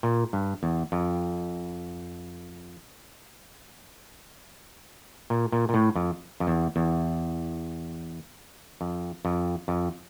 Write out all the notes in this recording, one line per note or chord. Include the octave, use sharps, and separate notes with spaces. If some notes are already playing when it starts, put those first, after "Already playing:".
A#2
G2
E2
F2
A#2
A#2
A#2
A2
F2
F2
E2
E2
F2
F2
F2